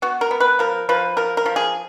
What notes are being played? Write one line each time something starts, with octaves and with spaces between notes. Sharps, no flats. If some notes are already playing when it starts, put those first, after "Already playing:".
B3 F#4
A#4
B3
B4
F3 A#4
F3 B4
F3 A#4
A#4
F3
G#4